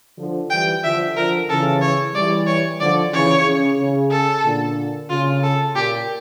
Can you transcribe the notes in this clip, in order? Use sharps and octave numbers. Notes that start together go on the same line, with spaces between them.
D3 F3
E3 G3 G5
D3 F3 E5
D3 F3 A#4
C#3 E3 A4
C#5
E3 G3 D5
C#5
D3 F3 D5
C#3 E3 C#5
C#3
C#3
A4
A#2 D3
C#3 F4
A4
A#2 G4